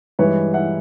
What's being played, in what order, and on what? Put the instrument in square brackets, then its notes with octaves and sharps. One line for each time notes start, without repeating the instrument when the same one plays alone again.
[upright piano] G2 E3 G#3 B4 C#5
E5 F#5